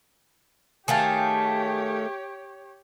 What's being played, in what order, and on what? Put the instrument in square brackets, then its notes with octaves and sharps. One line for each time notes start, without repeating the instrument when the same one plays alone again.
[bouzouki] D#3 A3 F5 [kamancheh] G4 C#5 [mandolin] G#4 G5 A5